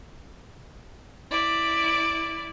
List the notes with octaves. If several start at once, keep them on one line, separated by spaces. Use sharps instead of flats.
E4 D5